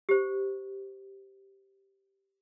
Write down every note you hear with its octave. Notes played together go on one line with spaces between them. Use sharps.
G4 C5